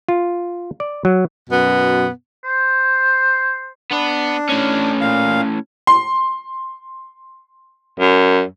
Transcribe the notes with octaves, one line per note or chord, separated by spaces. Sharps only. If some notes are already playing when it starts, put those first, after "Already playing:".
F4
D5
F#3
F#2 B2 B3
C5
B3 D4 B5
A2 C#4
A#2 F5
C6
F#2